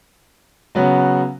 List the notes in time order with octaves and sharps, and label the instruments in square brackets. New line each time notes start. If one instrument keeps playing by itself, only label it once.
[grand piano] C#3 F#3 B3 F#4